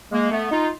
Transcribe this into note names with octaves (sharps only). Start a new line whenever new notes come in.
G#3 A#3
A3 B3
D#4 F4